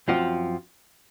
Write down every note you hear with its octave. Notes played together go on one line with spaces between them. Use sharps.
F#2 F3 C4 F4